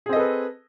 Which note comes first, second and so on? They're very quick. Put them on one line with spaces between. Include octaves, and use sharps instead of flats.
G#4 C4 D#5 A4 B4